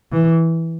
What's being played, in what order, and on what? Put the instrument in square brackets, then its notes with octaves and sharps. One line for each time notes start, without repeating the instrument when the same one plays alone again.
[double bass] E3